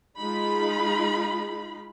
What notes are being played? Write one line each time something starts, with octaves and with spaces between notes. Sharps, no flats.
G#3 D#4 F4 B5